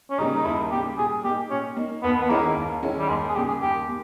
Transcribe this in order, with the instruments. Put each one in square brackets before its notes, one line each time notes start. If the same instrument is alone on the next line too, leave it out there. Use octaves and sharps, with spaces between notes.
[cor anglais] C#4
[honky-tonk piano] C#3 G3 A#3 [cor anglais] D#4
[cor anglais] D#4
[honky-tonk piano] D#2 [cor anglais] E4
[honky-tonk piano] C#3 G3 A#3 [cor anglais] G4
[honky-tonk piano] A#2 [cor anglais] G#4
[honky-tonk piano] A#3 D#4 [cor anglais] G4
[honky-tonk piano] A#2 [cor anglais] C#4
[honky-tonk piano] A#3 D#4
[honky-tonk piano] D#2 [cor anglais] B3
[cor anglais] B3
[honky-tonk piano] D#3 G#3 C#4 E4 [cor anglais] A#3
[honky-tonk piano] D#2
D#3 G#3 C#4 E4
[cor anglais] G3
[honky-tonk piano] D#2 [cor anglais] G#3
[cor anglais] G#4
[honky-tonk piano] C#3 G3 A#3 [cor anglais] G4
[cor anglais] G#4
[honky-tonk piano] D#2 [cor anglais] G4
[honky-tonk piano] A#3